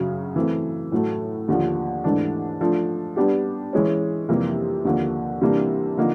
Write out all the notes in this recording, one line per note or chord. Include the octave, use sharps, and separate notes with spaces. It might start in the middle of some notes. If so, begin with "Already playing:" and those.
Already playing: F#2 C#3 F#3
E3 A3 C4
A2 F#3 A3
D#2 D3 F3
G#2 E3 A3 D4
F3 A3 D4
G3 B3 D4 G4
E3 G#3 C#4
F2 C3 E3 G3 A#3
D#2 D3 F3 A#3
C3 E3 G3 A#3 D4
D3 F3 A#3 D#4